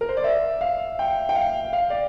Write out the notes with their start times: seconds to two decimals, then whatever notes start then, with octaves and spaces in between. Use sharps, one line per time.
0.01 A#4
0.09 C5
0.17 D5
0.24 E5
0.61 F5
0.99 G5
1.29 G5
1.35 F5
1.73 F5
1.90 D5